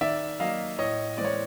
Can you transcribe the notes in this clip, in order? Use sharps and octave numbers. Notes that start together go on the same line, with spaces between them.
D#3 D5 E5
F#3 A#3 D#5 F5
A2 C#5 D#5
E3 G#3 C4 D5
C#5